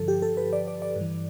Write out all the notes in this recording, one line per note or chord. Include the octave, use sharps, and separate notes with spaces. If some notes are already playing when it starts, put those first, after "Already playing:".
Already playing: G2 D3 F3 A4
G4
A4
B4
D5
D5
D5
G2 E3